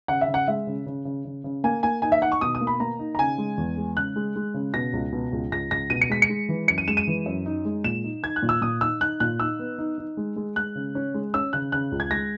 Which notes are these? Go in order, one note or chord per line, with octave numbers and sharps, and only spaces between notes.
C#3 F#5
E5
C#3
F#5
G#3 E5
C#3
C#3
C#3
C#3
C#3
A#3 G#5
A#3 G#5
D#4 G#5
E5
D#4 F#5
C#6
B2 D#6
D#6
A#3
B5
A#3 A#5
D#4
A#5
C#3 G#5
G#3
E2
G#3
C#3 F#6
G#3
G#3
C#3
B2 A#6
C#2
B2
C#2
C#2 A#6
C#2 A#6
B2 D#7
C#7
G#3 B6
C#7
G#3
E3
F#2 C#7
D#7
G#3 E7
D#7
E3
F#2
D#4
G#3
A#2 E7
D#4
D#4 G#6
F#6
A#2
E6
A#2 D#6
D#4 E6
D#4 F#6
A#2 F#6
D#4 E6
B3
D#4
D#4
G#3
G#3
G#3 F#6
C#3
C#4
G#3
C#4 E6
C#3 F#6
C#3 F#6
C#2
G#6
G#3 A#6